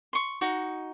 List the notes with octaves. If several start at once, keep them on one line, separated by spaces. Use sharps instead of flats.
C6 C#6
D#4 F#4